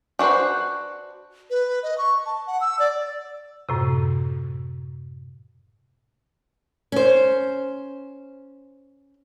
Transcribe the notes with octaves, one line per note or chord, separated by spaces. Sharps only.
D4 F#4 G#4 B4 C5
B4
D#5
C#6
A5
F#5
E6
D5
F#2 A2 C3
C#4 C5